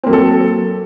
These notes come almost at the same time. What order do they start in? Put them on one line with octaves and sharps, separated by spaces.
C4 A#3 F#3 A4